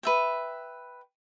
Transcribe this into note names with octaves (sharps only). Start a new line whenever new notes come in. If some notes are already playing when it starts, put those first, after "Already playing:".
B4 E5 G5